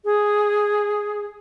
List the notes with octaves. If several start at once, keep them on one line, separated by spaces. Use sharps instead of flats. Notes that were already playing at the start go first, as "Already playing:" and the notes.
G#4